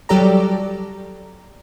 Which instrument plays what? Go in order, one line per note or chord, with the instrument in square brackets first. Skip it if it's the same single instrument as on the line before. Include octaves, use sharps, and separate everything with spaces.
[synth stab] F#3 G3 G4 A4 D5 A#5